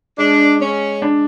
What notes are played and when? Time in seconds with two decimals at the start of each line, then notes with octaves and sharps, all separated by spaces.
0.18 G#3 D4
0.59 G#3 C#4
1.02 D4